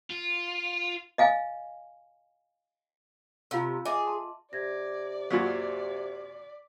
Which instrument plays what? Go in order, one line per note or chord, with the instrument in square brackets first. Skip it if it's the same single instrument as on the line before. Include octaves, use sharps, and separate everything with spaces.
[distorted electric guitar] F4
[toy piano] D#5 F5 G#5
[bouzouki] C3 [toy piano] F4 F5 E6
[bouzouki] G#4 [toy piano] D#5 E5 D6
[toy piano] A5 C6
[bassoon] C3 [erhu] D5 [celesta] G#6 A#6
[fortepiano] F#2 A#2 F#3 [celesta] B6